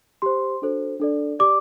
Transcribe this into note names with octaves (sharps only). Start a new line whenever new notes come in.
G4 C5 C6
D4 F#4 A4 C5
D4 A4 D5
G4 D5 D6